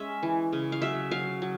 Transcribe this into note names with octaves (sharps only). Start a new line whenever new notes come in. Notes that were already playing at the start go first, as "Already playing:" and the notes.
Already playing: G#3 C#4 E5
E3
C#3
F5
F#3 E5
F#3 F5
F#3